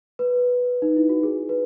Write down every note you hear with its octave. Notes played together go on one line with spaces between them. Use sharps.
B4
D#4
E4
F#4
G#4
B4